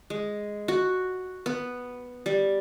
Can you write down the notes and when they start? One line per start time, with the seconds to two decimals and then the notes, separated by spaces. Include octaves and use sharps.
0.10 G#3
0.68 F#4
1.46 B3
2.26 G3